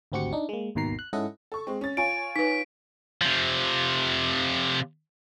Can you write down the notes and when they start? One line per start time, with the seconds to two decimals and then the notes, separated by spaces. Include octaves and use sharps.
0.12 G#1 D2 C4 F#4 G4 C#7
0.33 D4 D#4
0.49 G#3 A#3
0.75 G#1 D#2 B2 D#3 A#5 C7
0.99 F#6
1.13 G#2 C#4 E4 A4 D#5 F#5
1.52 A4 C#6
1.67 G#3 C4
1.81 C#4 A6
1.97 F4 C#5 G#5 D7
2.36 D#4 B4 B6
3.22 C3 F3